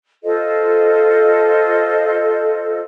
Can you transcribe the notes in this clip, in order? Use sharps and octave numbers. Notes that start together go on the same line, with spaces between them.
F4 A4 C5 D#5